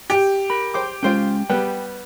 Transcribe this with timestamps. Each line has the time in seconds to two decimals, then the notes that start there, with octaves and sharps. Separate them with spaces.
0.10 G4
0.50 A#4 B5
0.74 C5 G5 D6
1.03 G#3 C#4 F4 C5 G5
1.49 G3 B3 G5 F#6